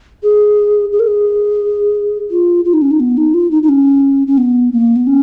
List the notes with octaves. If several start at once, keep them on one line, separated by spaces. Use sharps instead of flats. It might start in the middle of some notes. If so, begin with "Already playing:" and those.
G#4
G#4
A#4
G#4
F4
F4
D#4
C#4
D#4
B3
D#4
F4
D#4
D#4
C#4
C#4
B3
A#3
B3
C#4